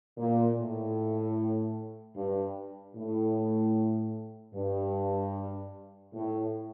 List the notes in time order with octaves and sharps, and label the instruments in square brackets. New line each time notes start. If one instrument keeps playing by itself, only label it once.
[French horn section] A#2
A2
G2
A2
G2
A2